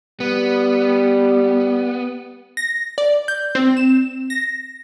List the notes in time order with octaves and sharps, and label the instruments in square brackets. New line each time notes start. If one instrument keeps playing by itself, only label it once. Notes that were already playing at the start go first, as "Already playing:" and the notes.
[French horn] G3 [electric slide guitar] B3
[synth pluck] A#6
D5
G6
C4
E7
A#6